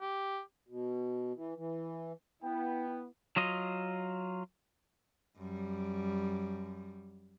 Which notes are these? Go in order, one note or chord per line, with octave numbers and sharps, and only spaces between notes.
G4
B2
E3
E3
B3 E4 G5
F#3 F4 D#5
F#2 G3